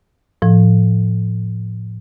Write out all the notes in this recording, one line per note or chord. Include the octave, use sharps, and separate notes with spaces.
A2 F3